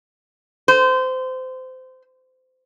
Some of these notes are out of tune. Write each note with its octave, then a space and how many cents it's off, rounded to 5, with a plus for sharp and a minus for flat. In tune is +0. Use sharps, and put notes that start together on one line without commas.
C5 -25